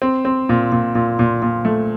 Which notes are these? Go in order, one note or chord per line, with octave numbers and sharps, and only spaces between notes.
C4
C4
A#2
A#2
A#2
A#2
A#2
A3